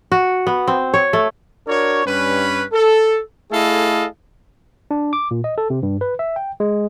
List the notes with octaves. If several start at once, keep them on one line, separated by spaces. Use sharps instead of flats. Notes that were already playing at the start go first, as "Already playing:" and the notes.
F#4
B3
C4
C#5
A3
D4 F#4 A#4 C#5
G2 C#4 B4
A4
A3 E4 G#4 A4 D#5 F5
D4
D6
A#2
D#5
A4
C3
G2
B4
E5
G5
G#3